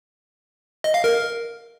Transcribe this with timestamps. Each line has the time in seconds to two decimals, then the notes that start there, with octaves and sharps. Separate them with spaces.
0.84 D#5
0.94 F5
1.04 A#4